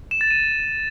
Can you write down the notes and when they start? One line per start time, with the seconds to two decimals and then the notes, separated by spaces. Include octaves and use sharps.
0.11 E7
0.21 A6
0.30 D#7